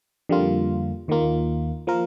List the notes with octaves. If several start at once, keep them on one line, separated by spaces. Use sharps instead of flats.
F2 D3 G3 A#3 F4
D#2 D#3 A#3 F4
F3 A#3 F4 A#4